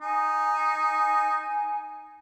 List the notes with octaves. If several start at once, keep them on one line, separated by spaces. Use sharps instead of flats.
D#4 G#5